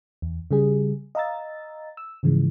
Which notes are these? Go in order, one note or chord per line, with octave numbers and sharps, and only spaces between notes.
E2
C#3 G3 G#4
D#5 F5 A#5 E6 A6
E6
G#2 C#3 E3 F3 G#3